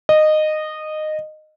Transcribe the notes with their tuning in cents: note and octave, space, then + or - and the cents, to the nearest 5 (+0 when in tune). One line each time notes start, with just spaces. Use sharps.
D#5 -15